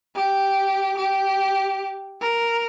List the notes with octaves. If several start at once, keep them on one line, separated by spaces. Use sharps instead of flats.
G4
G4
A#4